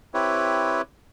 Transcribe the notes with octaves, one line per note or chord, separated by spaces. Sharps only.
C4 E4 G4 B4 C#5